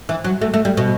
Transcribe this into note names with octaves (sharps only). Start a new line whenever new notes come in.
E3
F#3
A3
A3
G3
B2